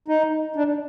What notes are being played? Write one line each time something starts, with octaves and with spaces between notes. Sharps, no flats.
D#4
D4